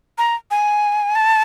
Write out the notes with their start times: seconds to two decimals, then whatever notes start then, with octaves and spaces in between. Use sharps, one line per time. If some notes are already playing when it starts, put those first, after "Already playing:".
0.18 A#5
0.51 G#5
1.15 A5